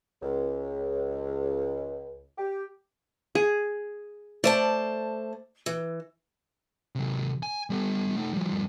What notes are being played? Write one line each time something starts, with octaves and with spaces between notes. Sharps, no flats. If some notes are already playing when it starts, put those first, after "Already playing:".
C#2
G4
G#4
A3 C5 D5 A5
E3
C3 F#3
G#5
G3 B3
A3 D#4
F3 G3
G2 F3